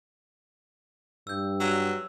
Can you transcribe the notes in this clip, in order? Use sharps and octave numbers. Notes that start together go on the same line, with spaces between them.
G2 E6 G6
F#3 E6